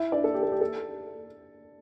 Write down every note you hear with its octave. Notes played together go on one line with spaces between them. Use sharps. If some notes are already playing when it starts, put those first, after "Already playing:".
Already playing: E4 E5
D4 D5
A4
G4
A4
G4
A4